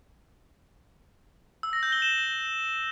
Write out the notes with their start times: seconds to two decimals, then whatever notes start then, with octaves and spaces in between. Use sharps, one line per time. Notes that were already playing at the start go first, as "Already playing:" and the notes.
1.63 E6
1.73 A#6
1.83 G6
1.92 G7
2.02 E7